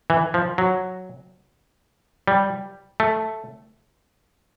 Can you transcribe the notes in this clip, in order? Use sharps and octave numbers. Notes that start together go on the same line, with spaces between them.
E3
F3
F#3
G3
A3